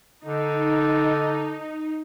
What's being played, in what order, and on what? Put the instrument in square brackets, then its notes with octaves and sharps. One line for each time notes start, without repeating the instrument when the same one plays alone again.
[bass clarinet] D3 [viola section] D#4